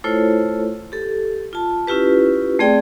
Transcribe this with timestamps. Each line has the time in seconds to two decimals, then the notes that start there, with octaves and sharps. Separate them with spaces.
0.04 A3 E4 F4 A4 C5 C#5
0.92 G4 A4
1.53 F4 A5
1.87 C#4 E4 F4 G4 B4
2.59 A3 C4 G#4 D5 G5